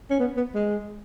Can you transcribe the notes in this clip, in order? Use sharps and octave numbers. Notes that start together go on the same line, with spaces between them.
C#4
B3
B3
G#3